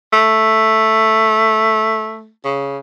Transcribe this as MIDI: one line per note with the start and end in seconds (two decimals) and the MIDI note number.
0.13 2.30 57
2.44 2.78 49